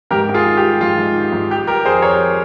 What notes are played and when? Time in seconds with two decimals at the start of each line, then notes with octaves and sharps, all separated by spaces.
0.11 G#2 G4 A#4
0.29 G#2
0.34 F4 G#4
0.46 D#3
0.57 G4
0.63 G3
0.81 G#2 F4
0.98 G#2
1.16 D#3
1.33 G#2
1.50 G3 G4
1.67 G3 G4 A#4
1.85 F2 G#4 C5
2.02 F2 A#4 C#5